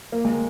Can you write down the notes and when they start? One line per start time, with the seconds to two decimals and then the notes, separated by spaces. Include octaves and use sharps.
0.12 A#3
0.25 G#3